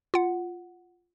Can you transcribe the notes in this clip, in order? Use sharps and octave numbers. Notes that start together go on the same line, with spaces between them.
F4 F#5